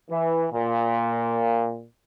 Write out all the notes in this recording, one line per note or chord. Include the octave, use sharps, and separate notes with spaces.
E3
A#2